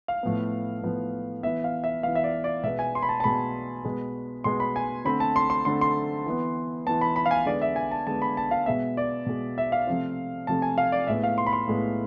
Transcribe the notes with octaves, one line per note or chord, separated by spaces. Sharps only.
F5
A2 F3 B3
A2 F3 B3
E3 B3 E5
F5
E5
E3 B3 F5
E5
D5
D5
B2 G#3 B3 E5
G#5
C6
B5
A5
A5
B2 G#3 B3 B5
B2 G#3 B3
B2 G#3 B3 C6
B5
G#5
D3 A3 C4 B5
A5
C6
C6
D3 A3 C4 C6
C6
E3 B3
E3 B3 A5
B5
B5
F5
G#5
D3 G#3 B3 D5
E5
G#5
A5
D3 G#3 B3 A5
B5
A5
F5
B2 G#3 B3 E5
D5
B2 G#3 B3
E5
F5
C3 F3 A3 C4
C3 F3 A3 C4 A5
G#5
F5
D5
A2 G#3 B3 E5
F5
C6
B5
C6
A2 G#3 B3